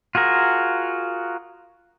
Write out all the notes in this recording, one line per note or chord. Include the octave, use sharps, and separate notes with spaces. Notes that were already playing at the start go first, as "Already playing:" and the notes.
F4 F#4 G#4 A#4